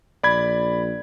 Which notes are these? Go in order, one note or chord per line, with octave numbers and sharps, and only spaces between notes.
A#1 D5 B5 G#6